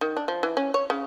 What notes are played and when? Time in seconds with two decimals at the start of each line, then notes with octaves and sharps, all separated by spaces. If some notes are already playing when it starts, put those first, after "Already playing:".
0.01 D#3
0.17 D4
0.28 F3
0.43 E3
0.57 C#4
0.74 C#5
0.90 C#3